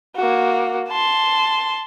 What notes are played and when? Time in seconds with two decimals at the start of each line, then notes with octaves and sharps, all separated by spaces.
0.16 A#3 F#4
0.89 A5 C6